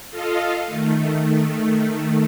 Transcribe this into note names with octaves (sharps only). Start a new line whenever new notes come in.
F4 A4 D#5 F5
D#3 A3